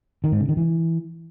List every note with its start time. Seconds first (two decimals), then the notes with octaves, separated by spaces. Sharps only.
0.24 D#3
0.32 G#2
0.40 C#3
0.49 D#3
0.57 E3